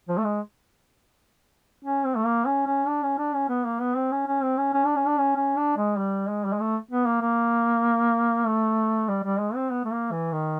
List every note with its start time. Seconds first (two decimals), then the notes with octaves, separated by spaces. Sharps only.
0.08 F3
0.17 A3
0.24 G#3
1.84 C#4
2.05 C4
2.16 A3
2.25 A#3
2.46 C#4
2.67 C#4
2.87 D4
3.03 C#4
3.18 D4
3.33 C#4
3.49 B3
3.65 A#3
3.81 B3
3.96 C4
4.12 C#4
4.27 C#4
4.43 C4
4.58 C#4
4.74 C#4
4.85 D4
4.96 C#4
5.07 D4
5.18 C#4
5.36 C#4
5.57 D4
5.77 G#3
5.98 G3
6.29 G#3
6.45 G3
6.53 G#3
6.60 A3
6.91 B3
7.07 A#3
7.22 A#3
8.46 A3
9.09 G3
9.23 G3
9.40 G#3
9.55 C4
9.70 B3
9.85 A3
9.92 A#3
10.12 E3
10.32 D#3